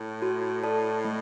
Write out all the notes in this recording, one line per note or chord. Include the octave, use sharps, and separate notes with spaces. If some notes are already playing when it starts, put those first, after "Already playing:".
Already playing: A2
F#4
A4 D5 A5
A3